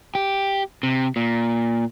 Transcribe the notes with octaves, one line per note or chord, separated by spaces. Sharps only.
G4
C3
A#2